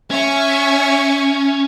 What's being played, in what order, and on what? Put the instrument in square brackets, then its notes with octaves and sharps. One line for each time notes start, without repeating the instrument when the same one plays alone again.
[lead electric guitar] C#4 [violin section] E5 G#5 C#6